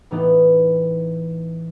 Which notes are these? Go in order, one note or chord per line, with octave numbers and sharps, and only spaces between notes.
A2 E3 A3 B3 D#4 G4